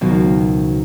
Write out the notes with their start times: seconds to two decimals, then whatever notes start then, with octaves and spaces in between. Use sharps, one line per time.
0.01 C#2 B2 D#3 F3 F#3